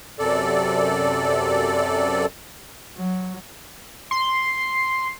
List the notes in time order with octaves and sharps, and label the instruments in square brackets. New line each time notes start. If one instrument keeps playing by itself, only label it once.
[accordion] F#2 C3 A4 D5
[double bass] F#3
[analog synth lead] C6